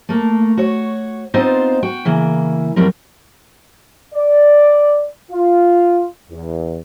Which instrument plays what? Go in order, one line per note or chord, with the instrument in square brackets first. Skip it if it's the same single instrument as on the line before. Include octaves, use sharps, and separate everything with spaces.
[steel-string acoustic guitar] A3 A#3
F#4 C#5
B3 C4 D#4 F4 C5 D#5
F#4 G5
C#3 E3 A#3
F2 F#3 G3 C4 A#4
[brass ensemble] D5
F4
E2